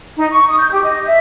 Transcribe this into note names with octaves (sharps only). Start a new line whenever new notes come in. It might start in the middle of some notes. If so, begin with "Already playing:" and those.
D#4
C#6
D#6
G6
G4
D#5
E5